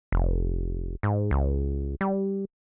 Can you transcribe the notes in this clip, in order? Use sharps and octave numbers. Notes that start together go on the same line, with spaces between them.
F1
G#2
C#2
G3